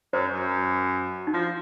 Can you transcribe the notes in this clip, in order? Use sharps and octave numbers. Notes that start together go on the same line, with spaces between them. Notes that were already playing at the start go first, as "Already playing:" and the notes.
F#2 C5
F#2
D#4
F3 F4